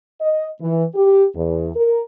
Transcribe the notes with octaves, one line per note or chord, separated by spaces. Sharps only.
D#5
E3
G4
E2
A#4